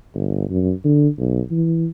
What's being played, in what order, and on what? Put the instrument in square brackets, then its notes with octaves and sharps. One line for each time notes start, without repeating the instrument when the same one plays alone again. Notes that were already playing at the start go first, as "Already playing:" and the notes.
[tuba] G1
F#2
D3
B1
E3